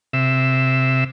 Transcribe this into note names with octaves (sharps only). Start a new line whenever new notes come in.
C3 E5